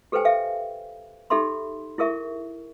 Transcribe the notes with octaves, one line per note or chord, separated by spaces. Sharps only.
G4 A4 B4 C5 G5 G#5
A4 E5 F5 G5
D#4 G4 A4 E5 B5 C6
E4 G#4 A#4 E5 C#6